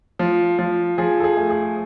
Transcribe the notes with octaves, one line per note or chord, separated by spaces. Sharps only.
F3
F3
F3 G#4
A4
G#4
A3
G#4